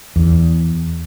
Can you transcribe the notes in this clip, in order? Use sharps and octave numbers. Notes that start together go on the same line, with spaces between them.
E2